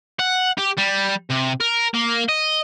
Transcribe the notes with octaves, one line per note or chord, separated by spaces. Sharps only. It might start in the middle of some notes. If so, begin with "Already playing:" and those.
F#5
G4
G3
C3
A#4
A#3
D#5